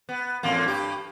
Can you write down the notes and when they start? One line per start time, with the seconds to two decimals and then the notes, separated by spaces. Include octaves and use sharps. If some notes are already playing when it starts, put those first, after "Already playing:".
0.09 B3
0.43 E2 A2 A#3
0.65 G2 G4